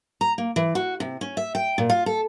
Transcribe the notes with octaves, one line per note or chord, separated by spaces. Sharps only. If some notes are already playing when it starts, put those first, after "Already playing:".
A#5
A#3
E3
F#4
C3
C#4
E5
G5
A#2
F4
A4